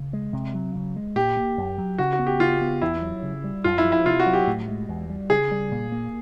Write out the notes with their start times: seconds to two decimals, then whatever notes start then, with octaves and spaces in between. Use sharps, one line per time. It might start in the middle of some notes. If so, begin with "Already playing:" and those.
Already playing: C#3
0.13 G#3
0.33 C3
0.54 F#3
0.75 C#3
0.96 G#3
1.16 A#2 G4
1.37 A#3
1.58 F#2
1.78 F#3
1.98 C#3 F#4
2.13 F#4
2.19 B3
2.27 G4
2.40 C#3 F4
2.61 B3
2.82 E2 E4
3.02 F#3
3.22 C#3
3.44 G3
3.64 F#2 F4
3.78 E4
3.85 F3
3.92 E4
4.05 C3 F4
4.20 F#4
4.26 F#3
4.33 G4
4.47 A2
4.68 G#3
4.88 E2
5.10 G3
5.30 C#3 G#4
5.51 G3
5.72 A#2
5.92 A#3